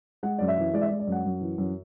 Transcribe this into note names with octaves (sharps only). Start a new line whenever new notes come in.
G#3 F#5
F#2 D5
E5
E3
G#3 D5
E5
D5
G#3
D5
F#2
F#5
F#2
E3
F#2